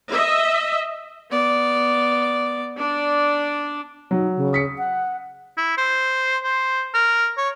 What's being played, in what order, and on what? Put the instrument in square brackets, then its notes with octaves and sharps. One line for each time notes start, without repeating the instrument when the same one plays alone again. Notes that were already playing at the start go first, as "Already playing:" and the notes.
[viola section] D#5 E5
[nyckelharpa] B3 D5
D4 D5
[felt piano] F#3 [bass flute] D#4
[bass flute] C#3
[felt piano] D#6 B6 C#7
[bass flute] F#5
[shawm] E4
C5
C5
A#4
C#5